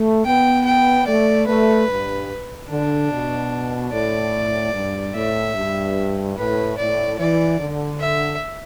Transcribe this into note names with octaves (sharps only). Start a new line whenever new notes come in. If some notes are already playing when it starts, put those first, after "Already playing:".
Already playing: A3
B3 G5
G5
A3 D5
A3 B4
G2
D3 D4
B2
A2 D5
G2
A2 E5
G2
A2 B4
A2 D5
E3 D5
D3
E5